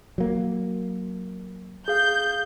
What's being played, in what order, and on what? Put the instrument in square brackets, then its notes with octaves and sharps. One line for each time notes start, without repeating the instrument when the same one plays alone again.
[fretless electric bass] F#3 A#3
[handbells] G#4 F5 [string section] G6